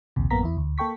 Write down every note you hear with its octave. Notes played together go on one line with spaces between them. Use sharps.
A#1 D#2 C3
A1 F#2 A#3 B3 A#5 B6
E2 E4
D2
A#3 A4 G5 C#6 B6